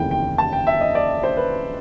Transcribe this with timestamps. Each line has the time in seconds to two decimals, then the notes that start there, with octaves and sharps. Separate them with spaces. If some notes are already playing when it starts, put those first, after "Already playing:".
Already playing: F1 D#2 C#3 E3 G5
0.11 G5
0.38 A5
0.53 G5
0.67 E5
0.81 D#5
0.95 D5
1.23 C5
1.37 B4